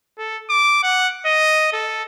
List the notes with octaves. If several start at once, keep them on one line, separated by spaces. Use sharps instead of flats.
A4
D6
F#5
D#5
A4